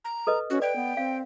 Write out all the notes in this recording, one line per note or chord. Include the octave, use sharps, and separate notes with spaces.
A#5
A4 B4 D#5
C#4 F#4
B4 D5 G5
B3
C4 F5